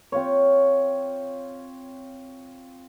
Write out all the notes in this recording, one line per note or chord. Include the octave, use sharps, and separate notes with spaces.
C4 F4 C#5